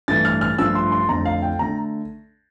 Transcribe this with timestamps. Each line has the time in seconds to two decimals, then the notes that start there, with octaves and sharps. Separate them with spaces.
0.08 G2 E3 A3 A6
0.25 F6
0.41 F6
0.58 G2 F3 A3 E6
0.75 C6
0.92 C6
1.09 F2 D3 A3 A#5
1.25 F5
1.42 G5
1.59 D3 A3 A#5